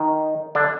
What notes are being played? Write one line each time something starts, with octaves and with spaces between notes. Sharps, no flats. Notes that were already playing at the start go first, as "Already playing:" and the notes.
Already playing: D#3 D#4
D3 D4